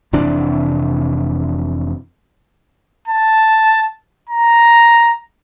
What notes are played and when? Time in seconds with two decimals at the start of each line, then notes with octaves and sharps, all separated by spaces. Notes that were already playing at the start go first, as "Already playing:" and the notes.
0.13 F1 C3 E3 D4
3.08 A5
4.29 A#5